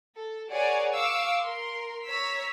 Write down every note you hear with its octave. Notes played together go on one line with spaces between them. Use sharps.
A4
G#4 A#4 C#5 D5 F#5 G#5
F5 C#6 D6 E6
A#4 C6
C#5 A#5 E6 B6